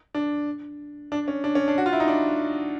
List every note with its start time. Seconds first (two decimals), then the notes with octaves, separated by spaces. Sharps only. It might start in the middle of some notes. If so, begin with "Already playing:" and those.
0.15 D4
1.12 D4
1.28 C#4
1.44 D4
1.55 C#4
1.68 D4
1.78 F#4
1.86 F4
1.93 E4
2.00 D#4
2.08 D4